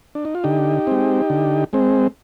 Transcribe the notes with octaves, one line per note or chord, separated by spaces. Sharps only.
D4
D#4
F4
D3 D#4 G4
G#3 C4
D3
G#3 C4